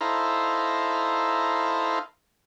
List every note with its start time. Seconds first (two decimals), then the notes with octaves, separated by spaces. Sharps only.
0.01 D#4 E4 A4 C5 F5 A#5